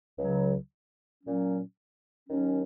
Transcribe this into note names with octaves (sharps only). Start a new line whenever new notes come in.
C#2 C#3 F#3
A#2 F#3 C#4
D#2 D#3 F#3 C#4